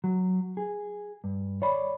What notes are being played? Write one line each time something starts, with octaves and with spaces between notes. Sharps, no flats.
F#3
G#4
G2
C#5 D5 B5